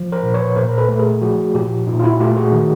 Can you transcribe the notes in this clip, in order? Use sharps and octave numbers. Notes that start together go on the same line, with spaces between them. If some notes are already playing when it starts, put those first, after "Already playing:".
Already playing: F3
A#4 C5
A#2
B4 C#5
A#2 A#4 C5
A#4
A4 B4
A3 B4
G#4 A#4
F3 F#4 G#4
A#2 F4 G4
A#2 D#4 F4
F4
E4 F#4
A3 F4 G4
F#4 G#4
D#3